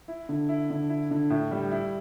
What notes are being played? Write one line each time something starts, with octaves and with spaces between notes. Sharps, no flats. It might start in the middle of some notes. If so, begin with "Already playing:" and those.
E4
D3
E4
D3
E4
D3
A2
G3
E4